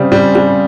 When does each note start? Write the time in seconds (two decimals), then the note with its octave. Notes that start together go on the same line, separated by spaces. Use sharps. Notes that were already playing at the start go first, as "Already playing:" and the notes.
Already playing: C#3 G3 C4
0.12 G3
0.35 G3